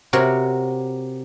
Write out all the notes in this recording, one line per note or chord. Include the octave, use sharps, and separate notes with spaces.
C3 F#4 A#4 C#5 F#5